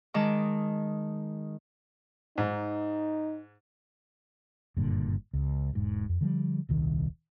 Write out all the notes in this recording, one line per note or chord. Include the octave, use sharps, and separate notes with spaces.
D#3 G#3 A5 D6
G#2 D#4
F#1 G2 A#2 D3
C#2
E1 G#2
F2
D3 F3 G3
D#1 C2 D#3